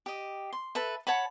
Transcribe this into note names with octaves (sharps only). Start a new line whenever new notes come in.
G4 D#5
C6
A4 B4 E5
C#5 F#5 A5 B5